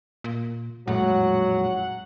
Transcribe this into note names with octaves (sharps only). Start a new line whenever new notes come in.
A#2
A#1 F2 A2 F#3 G#3 F#5